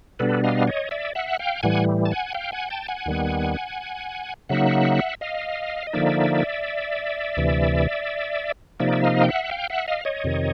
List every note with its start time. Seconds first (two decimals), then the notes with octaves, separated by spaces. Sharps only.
0.19 B2 G3 B3 D4 A4 B4
0.44 D#5 F5
0.67 C#5 D#5
0.91 D5 E5
1.15 E5 F#5
1.39 F5 G5
1.63 A2 E3 G3 F#5 G#5
2.06 A5
2.11 F#5 G#5
2.35 F5 G5
2.52 F#5 G#5
2.70 G5 A5
2.88 F#5 G#5
3.06 D#2 D#3 G3 B3
4.49 C#3 F#3 A#3 D#4 E5 F#5
5.21 D#5 F5
5.87 D#5
5.93 D3 F3 A#3 D#4 D5 E5
7.37 D2 C3 E3
8.80 C3 F3 A#3 D#4 D5 E5
8.93 E5
9.04 D#5 F5
9.23 G5
9.28 E5 F#5
9.51 F5 G5
9.70 E5 F#5
9.88 D#5 F5
10.05 C#5 D#5
10.24 F2 C3 D#3